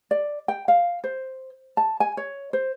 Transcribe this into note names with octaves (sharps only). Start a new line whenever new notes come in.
D5
G5
F5
C5
A5
G#5
C#5
C5